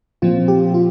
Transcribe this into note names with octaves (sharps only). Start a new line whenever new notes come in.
A#2 F3 C4 F4
G4
F4